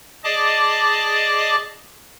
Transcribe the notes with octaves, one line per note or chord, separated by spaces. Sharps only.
G#4 D5 D#5 A5 D6